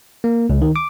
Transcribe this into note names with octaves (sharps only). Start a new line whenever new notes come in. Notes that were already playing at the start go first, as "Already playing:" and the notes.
A#3
C#2
D#3
D6